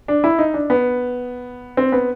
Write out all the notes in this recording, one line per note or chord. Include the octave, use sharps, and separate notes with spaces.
D4
E4
D#4
D4
B3
C4
B3